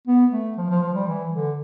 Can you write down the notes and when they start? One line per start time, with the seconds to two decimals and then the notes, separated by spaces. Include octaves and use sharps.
0.07 B3
0.32 A3
0.57 F3
0.70 F3
0.83 F3
0.95 G3
1.08 E3
1.33 D3